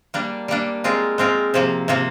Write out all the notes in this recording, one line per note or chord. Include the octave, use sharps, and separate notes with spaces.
G3 A#3 D4
G3 A#3 D4
G#3 C4 F4 A#4
G#3 C4 F4 A#4
C3 F3 A#3
C3 F3 A#3